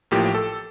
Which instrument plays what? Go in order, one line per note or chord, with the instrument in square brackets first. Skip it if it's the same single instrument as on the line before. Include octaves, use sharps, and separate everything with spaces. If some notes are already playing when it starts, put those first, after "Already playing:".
[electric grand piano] A1 A2 F3 A#3 G4
A4